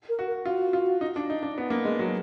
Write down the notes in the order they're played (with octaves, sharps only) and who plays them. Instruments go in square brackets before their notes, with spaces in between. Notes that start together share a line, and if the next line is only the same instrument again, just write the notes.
[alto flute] A#4
[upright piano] F#4
[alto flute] A#4
[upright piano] F4 [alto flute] F#4
[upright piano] F4
D#4
D4
D#4
D4
B3
A#3
G#3
F#3